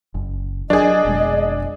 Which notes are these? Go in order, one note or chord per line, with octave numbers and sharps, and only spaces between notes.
F#1
F#3 D4 G#4 D#5
F1 B2 G#3